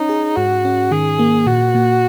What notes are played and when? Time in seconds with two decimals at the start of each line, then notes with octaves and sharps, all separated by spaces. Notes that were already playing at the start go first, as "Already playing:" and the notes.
Already playing: C#4 D#4 C#5
0.09 G#4
0.36 G#2 F#4
0.65 C#4
0.91 D#3 G#4
1.19 A#3
1.46 A#2 F#4
1.75 A#2